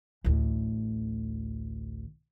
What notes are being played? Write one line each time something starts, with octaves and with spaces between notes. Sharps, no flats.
A1 D2